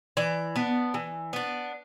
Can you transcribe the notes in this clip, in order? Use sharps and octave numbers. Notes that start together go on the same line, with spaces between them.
E3 D5
B3 D4
E3
B3 D4